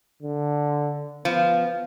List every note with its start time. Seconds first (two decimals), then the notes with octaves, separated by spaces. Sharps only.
0.22 D3
1.25 F3 B3